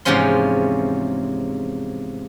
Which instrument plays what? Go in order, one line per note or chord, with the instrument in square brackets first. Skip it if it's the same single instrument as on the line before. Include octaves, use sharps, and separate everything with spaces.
[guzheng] E2 G#2 C3 F3 C#4 C6